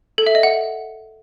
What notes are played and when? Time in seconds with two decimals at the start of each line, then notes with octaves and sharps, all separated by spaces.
0.18 A4
0.27 E5
0.35 D#5
0.43 F#5